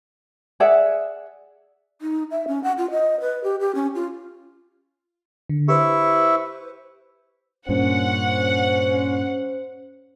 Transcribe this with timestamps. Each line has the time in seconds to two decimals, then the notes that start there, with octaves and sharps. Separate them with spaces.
0.60 G#4 D5 E5 F#5
2.02 D#4
2.31 E5
2.48 C#4
2.64 F#5
2.78 F4
2.91 D#5
3.21 B4
3.44 G4
3.60 G4
3.75 C#4
3.95 F4
5.49 D3
5.68 E4 G4 B4 C5 E5 C#6
7.69 G2 A#2 C#4 C5 F#5